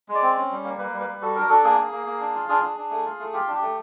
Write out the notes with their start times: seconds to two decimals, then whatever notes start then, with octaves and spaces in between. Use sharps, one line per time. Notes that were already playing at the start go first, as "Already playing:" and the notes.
0.09 G#3
0.15 D5
0.23 C4
0.36 C#4
0.50 G3
0.64 A#3
0.78 A#3 B4
0.93 G3
1.00 B4
1.07 G3
1.22 F#4 A4
1.35 D4 A#4
1.49 D4 A4
1.64 A#3 G#4
1.78 A#3
1.92 A#3
2.06 A#3
2.20 D4
2.35 F4
2.49 D4 G#4
2.63 D4
2.77 D4
2.91 A3
3.05 F4
3.19 A3
3.33 F4 G4
3.48 D4
3.55 G4
3.62 A3